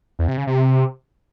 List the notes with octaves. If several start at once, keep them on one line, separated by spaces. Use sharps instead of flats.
E2
C3
C#3
C3